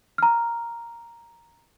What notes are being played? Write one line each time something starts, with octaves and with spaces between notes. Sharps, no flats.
A#5 F6